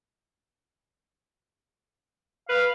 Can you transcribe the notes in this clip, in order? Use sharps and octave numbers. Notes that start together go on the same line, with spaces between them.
B4 F5